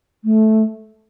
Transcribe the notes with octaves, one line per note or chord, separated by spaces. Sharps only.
A3